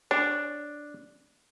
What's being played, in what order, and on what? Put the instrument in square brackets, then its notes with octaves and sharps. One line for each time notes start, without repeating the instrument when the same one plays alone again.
[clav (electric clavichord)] D4 [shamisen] C#5